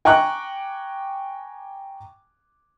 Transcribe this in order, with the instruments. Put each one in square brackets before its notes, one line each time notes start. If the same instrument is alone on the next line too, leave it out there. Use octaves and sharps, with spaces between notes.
[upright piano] G5 G#5 A#5 C#6 D6 F#6